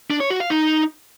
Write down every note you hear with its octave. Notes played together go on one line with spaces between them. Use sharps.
D4
C#5
F#4
F5
D#4